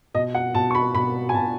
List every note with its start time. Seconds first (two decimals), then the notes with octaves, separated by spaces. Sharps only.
0.14 B2 D#5
0.35 F#5
0.55 B2 A5
0.71 C#6
0.75 B5
0.94 B2 B5
1.29 G#5
1.34 B2 A5